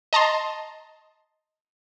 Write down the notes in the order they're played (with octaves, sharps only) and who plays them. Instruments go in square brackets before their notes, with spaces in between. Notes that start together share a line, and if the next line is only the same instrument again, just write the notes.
[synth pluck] D#5 A5 A#5 C6